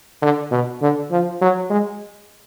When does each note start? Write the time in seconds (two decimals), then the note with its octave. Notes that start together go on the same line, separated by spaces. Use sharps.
0.22 D3
0.51 B2
0.82 D3
1.11 F3
1.41 F#3
1.70 G#3